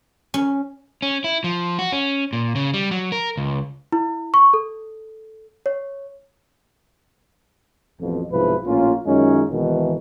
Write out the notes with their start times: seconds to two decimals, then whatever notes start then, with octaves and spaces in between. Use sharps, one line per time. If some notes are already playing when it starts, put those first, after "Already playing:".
0.34 C#4
1.02 C#4
1.24 E4
1.44 F3
1.79 F#4
1.92 C#4
2.33 A#2
2.55 C#3
2.74 G3
2.91 F#3
3.12 A#4
3.37 C#2
3.92 E4
4.34 C#6
4.54 A4
5.66 C#5
8.00 A1 F2 B2
8.31 B1 G#2 C3 F3 E4 B4
8.65 A#1 A2 A#3 C#4 F4
9.06 F#2 D#3 G#3 C#4 D#4 F4
9.50 G#1 G#2 B2 D#3 E3